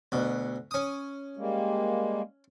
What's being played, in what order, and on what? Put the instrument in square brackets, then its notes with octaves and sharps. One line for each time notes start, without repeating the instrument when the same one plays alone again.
[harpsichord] D2 B2
C#4 D#6
[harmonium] G3 G#3 A#3